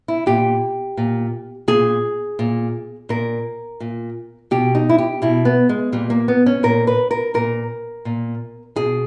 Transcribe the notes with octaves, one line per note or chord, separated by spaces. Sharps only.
E4
A#2 G4
A#2
A#2 G#4
A#2
A#2 A#4
A#2
B2 G4
D#4
E4
G4
B2 E4
B3
G#3
A#2 G3
A#3
B3
C#4
A#2 A#4
B4
A#4
A#2 A#4
A#2
B2 G#4